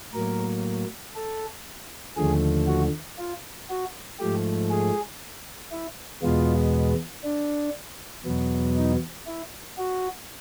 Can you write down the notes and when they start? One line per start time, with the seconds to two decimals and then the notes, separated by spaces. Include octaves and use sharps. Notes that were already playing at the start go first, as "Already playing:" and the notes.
0.14 A2 F#3 A#3 A#4
1.16 A4
2.17 D#2 D3 F3 A3 G#4
2.67 F#4
3.18 F4
3.70 F#4
4.19 G#2 F3 A3 G4
4.70 G#4
5.72 E4
6.22 E2 B2 G#3 B3 F4
7.24 D4
8.25 E2 B2 F#3 B3
8.76 D#4
9.27 E4
9.78 F#4